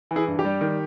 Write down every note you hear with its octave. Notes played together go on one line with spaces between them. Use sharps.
E3
E4 G#4
G2
G4
G3
D#3